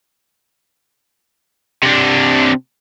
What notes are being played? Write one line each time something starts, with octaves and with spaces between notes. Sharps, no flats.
C3 D4